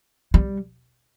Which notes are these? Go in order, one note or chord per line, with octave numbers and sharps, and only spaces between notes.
G3